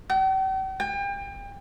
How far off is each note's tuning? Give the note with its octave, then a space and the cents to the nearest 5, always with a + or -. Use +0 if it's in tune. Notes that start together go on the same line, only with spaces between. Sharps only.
G5 -45
G5 +35